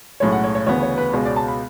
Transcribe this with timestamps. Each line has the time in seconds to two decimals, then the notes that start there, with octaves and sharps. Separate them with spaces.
0.20 B1 A2 G#3 C#4 C#5
0.32 F#5
0.44 C#5
0.55 C#5
0.67 D2 C#3 E3 B3 C#5
0.82 C#5
0.98 B4
1.13 C#2 B2 G#3 C#4 C#5
1.25 D5
1.36 A5
1.48 B5